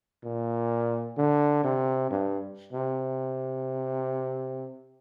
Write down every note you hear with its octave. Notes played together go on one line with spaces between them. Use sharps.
A#2
D3
C3
G2
C3